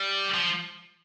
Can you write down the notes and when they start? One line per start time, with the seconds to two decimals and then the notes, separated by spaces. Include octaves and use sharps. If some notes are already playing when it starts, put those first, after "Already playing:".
Already playing: G3
0.34 F3